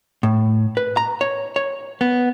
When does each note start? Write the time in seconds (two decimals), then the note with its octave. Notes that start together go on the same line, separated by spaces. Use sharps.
0.23 A2
0.77 B4
0.97 A#5
1.21 C#5
1.56 C#5
2.01 B3